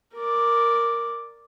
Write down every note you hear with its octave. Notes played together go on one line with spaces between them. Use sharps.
A#4 D5